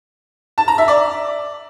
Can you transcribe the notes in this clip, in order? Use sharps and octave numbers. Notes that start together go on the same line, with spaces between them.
A5
A#5
E5
D5